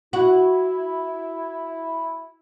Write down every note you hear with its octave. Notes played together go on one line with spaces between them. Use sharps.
E4 F#4